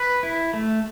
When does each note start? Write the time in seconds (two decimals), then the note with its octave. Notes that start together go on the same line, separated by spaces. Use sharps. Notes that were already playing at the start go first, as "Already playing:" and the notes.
Already playing: B4
0.23 E4
0.54 A3